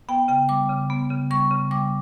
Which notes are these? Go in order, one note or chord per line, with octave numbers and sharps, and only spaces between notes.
B3 G5
C#3 G5
G3 D6
C#3
B3
C#3
G3 C#6
C#3
G3 D6